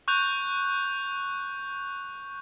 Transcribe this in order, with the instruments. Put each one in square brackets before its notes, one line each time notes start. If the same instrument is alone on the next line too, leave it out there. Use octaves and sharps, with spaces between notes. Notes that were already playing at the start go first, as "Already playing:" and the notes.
[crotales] C#6 F#6 G6 F7